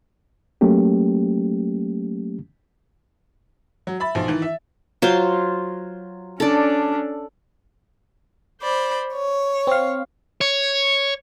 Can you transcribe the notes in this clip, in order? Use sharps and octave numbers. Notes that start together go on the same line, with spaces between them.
F#3 A3 A#3 C#4 G4
F#3
E5 B5 A6
B1 F3
D#3 E3
E5
F#3 F4 C5
C#4 D4 A4 D5
C5 D5 B5
C#5
C4 F5
C#5